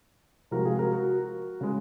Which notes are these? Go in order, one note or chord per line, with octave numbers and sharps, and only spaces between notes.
C3 F3 G#3 F#4 A#4
F4 G#4
F#4 A#4
F#4 A#4
C#3 G#3